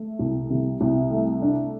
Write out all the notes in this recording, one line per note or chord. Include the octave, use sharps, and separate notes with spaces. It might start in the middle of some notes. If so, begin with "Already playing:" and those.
Already playing: A3
C2
C3
C2
A3
D4